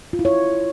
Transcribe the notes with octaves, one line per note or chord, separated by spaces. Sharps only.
F4
E4
C#5